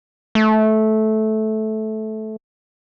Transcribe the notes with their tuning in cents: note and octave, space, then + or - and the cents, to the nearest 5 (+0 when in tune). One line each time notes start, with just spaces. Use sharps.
A3 -15